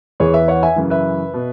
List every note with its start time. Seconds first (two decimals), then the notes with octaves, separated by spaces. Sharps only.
0.20 E2 E3 G#4 C#5
0.34 B4 E5
0.48 C#5 F#5
0.63 E5 G#5
0.76 F#2 C#3 E3
0.90 B4 E5
1.34 B2